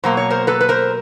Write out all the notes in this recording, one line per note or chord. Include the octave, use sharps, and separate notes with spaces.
B2 F#3 A#3 C5
C#5
A#4 C5
A4 B4
B4
A#4 C5